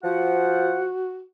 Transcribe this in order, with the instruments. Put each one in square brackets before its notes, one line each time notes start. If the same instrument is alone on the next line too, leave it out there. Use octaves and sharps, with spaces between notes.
[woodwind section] F3 F#5 [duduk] F#4